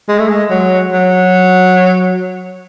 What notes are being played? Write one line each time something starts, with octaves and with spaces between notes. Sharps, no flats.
G#3
A3
G#3
F#3
F#3